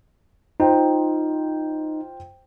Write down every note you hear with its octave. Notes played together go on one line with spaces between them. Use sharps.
D#4 F4 C5 G5